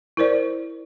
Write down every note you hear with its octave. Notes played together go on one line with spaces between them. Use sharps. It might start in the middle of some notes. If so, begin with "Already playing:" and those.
E4 A#4 C5 D5